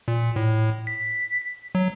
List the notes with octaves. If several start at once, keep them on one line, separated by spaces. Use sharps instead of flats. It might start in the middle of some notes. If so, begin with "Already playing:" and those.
A#2
A2
B6
F#3